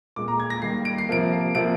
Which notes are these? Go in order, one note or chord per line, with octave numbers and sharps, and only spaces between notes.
A#2 G#3 D6
A#5
G#6
A#6
D#3 G3 A#3 C7
D7
C7
C3 F3 A#3 D7
C3 F3 A#3 D7